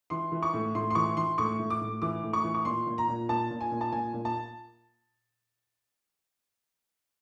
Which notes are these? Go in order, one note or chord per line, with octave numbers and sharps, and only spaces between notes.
E3 C6
E3
C#6
A2
A2 C6
C6
E3 C#6
E3 C6
A2 C#6
A2
D6
A2
E3 D6
A2
C#6
E3
C#6
A#2 C6
A#2
A#5
A#2
A#2 A5
A#2
G#5
A#2
A5
A#2 G#5
A#2
A5